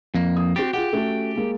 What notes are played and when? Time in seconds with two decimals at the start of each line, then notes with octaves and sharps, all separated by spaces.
0.14 F2 A#3
0.36 D#6
0.56 C4 F#4 G4 A6
0.73 F4 G4 G#4 F#5
0.93 A3 C#4 F#4
1.35 G#3 A#3